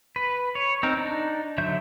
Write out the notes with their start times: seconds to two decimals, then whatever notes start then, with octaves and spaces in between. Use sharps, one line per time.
0.16 B4
0.55 C#5
0.83 C4 D#4 A#4
0.97 D4 D#4
1.58 D3 F#3 E5 G6